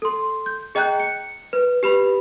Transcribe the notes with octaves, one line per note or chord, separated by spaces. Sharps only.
A4 C6
G6
G#4 D#5 G5 A#5 F#6 G6
C#7
B4
G4 B4 B5